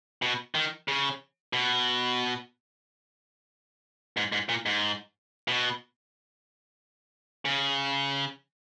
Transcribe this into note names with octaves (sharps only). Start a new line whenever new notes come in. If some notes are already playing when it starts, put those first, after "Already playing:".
B2
D#3
C#3
B2
G#2
G#2
A#2
G#2
B2
C#3